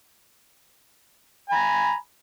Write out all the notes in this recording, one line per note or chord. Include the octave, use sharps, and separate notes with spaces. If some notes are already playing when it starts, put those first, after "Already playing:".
G#5 A#5 B5